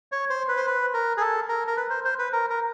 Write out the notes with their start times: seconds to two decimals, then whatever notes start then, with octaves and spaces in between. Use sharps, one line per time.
0.12 C#5
0.30 C5
0.48 B4
0.57 C5
0.67 B4
0.94 A#4
1.17 G#4
1.21 A4
1.49 A#4
1.67 A#4
1.77 B4
1.90 C5
2.05 C5
2.19 B4
2.33 A#4
2.50 A#4